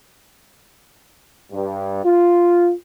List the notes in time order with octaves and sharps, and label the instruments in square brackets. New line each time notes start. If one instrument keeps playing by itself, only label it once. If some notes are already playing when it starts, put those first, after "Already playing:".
[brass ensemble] G2
F4